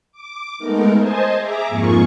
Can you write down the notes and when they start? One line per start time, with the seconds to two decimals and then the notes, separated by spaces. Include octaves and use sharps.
0.12 D6
0.59 G#3 A3 B3 D#4 A#4
0.97 C5 D#5 G#5 A5
1.36 G#4 E5 A#5 D6
1.68 F2 G#2 A#3 F4 G#4 C#6